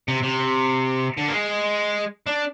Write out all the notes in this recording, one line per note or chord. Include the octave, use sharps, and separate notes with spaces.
C3
C3
D3
A#3
G#3
D4